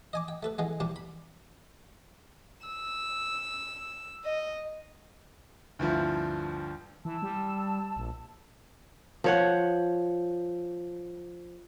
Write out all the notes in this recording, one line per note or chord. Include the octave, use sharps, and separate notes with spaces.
D#5 G#5 D6
G5
A3 A4 B4
E3 G#3 B3
C2 C3 G3 C4 G4
B5
E6
D#5
D2 G2 F3 E4
E3 A5 E6
G3
A#1
F3 C#5 F#5